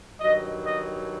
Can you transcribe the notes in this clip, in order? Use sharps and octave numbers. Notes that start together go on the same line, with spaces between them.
G2 D#3 F#3 D#5
D#5